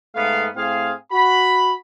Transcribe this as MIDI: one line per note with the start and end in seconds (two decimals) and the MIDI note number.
0.15 0.47 44
0.15 0.47 57
0.15 0.47 59
0.15 0.47 77
0.55 0.92 45
0.55 0.92 60
0.55 0.92 68
0.55 0.92 77
1.11 1.72 66
1.11 1.72 83